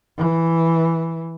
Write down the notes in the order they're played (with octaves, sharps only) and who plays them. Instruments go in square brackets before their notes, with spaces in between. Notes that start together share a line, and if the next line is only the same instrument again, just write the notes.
[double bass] E3